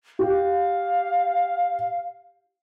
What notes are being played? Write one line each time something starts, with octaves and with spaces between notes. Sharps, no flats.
G4 F5